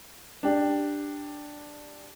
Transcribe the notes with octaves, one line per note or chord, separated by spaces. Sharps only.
D4 G4